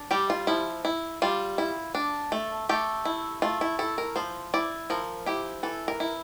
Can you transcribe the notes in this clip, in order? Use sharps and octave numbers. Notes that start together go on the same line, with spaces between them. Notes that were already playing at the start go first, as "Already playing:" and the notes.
Already playing: D4
G3 G4
F4
F3 E4
E4
G3 F4
E4
D4
A3
A3 G4
E4
A3 F4
E4
E4 A4
A#4
F3 C5
E4 D5
F3 A#4
E4 G4
E3 A4
A#4
E4